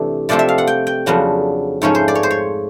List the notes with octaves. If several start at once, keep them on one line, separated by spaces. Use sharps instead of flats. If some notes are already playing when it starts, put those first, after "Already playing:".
Already playing: C3 E3 A3 D4
C3 F3 A3 C4 D5
E5
F5
F#5
G5
G5
F2 C#3 F#3 B3 D4
G#2 F3 A3 C#4 C#5
C5
D5
C#5
C5
C#5